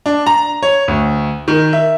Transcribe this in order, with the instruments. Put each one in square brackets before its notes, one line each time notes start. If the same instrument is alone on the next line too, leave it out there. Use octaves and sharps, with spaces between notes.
[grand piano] D4
A#5
C#5
D2
D#3
E5